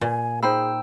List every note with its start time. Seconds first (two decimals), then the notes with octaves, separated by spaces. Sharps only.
0.01 A#2 G#5
0.43 D#4 G#4 C5 G5 B5 E6